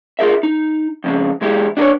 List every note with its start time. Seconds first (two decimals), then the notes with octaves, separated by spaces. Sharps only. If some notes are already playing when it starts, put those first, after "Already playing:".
0.19 F4 G#4 A#4 E5
0.43 D#4
1.04 F2 C#3 G#3
1.42 E2 G#3 E4 G4
1.77 D4 G4 A#4 B4 C#5